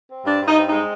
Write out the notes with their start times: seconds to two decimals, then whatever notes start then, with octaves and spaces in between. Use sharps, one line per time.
0.08 C4
0.25 G2 D4
0.41 G2 D#4
0.57 C4
0.67 G#3 D#4